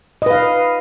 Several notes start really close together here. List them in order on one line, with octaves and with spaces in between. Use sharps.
D#5 B4 F5